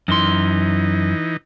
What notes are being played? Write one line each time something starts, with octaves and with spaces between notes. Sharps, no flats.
F#2 E3 D#4 C6